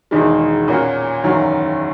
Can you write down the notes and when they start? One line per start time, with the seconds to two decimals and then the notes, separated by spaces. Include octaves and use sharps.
0.11 E1 E2 D#3 G#3 D#4
0.68 A#2 A#3 C#4 F#4
1.24 F#1 E2 D#3 F#3